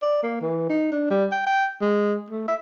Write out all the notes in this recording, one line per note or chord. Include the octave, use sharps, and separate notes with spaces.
D5
A#3
E3
D#4
D4
G3
G5
G5
G#3
A3
E5